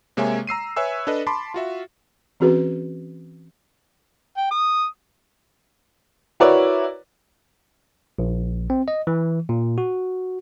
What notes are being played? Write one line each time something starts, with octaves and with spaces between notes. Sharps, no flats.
C3 G#3 A#3 C#5 E5 G#5
A#5 E6 C7 D#7
B4 C#5 E5 G#5 E6
D4 A4 B4 D#5
A5 B5 C6 D6
F4 F#4 E5
E3 C4 C#4 F#4 G#4 B4
G5
D#6
E4 F#4 A#4 B4 C#5 D5
A#1
C4
D#5
E3
A#2
F#4